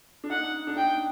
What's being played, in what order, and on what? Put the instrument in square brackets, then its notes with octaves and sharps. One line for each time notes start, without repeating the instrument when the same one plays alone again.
[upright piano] D4
[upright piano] D#4 [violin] F#5
[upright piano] D4
[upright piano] D#4 [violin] G5